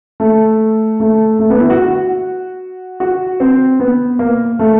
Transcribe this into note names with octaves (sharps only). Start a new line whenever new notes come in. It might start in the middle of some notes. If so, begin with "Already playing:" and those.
A3
A3
A3
B3
E4
F#4
F#4
F#4
C4
B3
A#3
A3